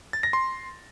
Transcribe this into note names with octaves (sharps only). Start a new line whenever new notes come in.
A6
A#6
C6